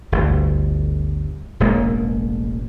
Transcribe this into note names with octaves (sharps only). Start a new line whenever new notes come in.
G1 D2
E1 A1 G#3 A#3